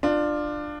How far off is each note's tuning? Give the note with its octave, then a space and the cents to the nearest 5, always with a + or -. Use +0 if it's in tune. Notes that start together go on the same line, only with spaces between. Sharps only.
D4 +20 F4 +0